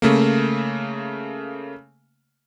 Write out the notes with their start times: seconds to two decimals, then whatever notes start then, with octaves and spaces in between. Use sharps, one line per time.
0.02 C#3 A3 A#3